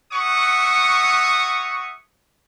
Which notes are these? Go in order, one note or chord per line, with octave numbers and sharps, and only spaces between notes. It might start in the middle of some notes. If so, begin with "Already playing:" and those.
F#4 C#5 E5 F#5 C#6 D#6